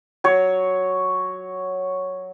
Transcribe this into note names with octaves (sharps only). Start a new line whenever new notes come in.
F#3 C#5